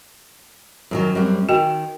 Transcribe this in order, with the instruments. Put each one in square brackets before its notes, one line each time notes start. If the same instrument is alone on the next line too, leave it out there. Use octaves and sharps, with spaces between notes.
[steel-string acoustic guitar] F#2 D#3 F#3
F#2 G3 C4
[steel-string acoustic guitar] D#3 [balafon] F#4 D#5 G5